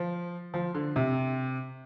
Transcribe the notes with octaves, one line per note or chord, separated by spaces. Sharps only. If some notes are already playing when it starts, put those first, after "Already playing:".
Already playing: F3
F3
D3
C3